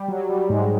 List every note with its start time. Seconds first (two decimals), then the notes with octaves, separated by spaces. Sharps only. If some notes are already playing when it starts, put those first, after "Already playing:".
Already playing: G3
0.08 F#3
0.29 G3
0.49 G#2 G#3